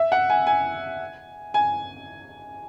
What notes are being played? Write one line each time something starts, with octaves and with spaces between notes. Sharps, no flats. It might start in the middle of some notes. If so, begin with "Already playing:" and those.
Already playing: E5
F#5
G#5
G#5
G#5